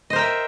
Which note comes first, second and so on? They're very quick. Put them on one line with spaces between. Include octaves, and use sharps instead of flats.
D#5 C5 A#4 G5 E5